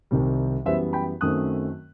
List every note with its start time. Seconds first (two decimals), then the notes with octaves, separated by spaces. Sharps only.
0.11 C2 C3 D#3 G3
0.65 F#2 E3 G3 B3 C5 E5
0.93 G5 B5
1.21 F#2 D#3 F#3 A3 C4 D#6 F#6